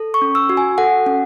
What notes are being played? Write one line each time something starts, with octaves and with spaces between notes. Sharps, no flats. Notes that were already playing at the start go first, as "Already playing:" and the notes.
Already playing: A4
C#6
C#4
E6
F#4
G#5
A4 F#5
C#4